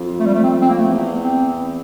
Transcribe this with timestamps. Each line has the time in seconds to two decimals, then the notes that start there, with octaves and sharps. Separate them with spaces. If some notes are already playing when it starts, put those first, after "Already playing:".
Already playing: F2
0.20 A3
0.26 G3
0.34 A3
0.44 C4
0.61 C4
0.70 A#3
0.78 A3
0.88 E2
1.24 C4